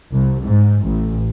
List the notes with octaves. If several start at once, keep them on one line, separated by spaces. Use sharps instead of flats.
C2
G#2
A1